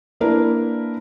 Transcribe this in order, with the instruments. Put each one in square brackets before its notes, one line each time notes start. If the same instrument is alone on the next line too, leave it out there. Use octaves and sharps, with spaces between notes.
[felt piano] A#3 D4 E4 A#4 B4